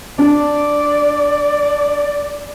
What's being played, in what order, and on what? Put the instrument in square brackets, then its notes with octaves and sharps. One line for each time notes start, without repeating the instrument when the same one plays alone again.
[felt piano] D4 [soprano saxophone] D5